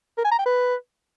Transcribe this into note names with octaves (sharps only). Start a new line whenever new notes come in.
A#4
G#5
A#5
G5
B4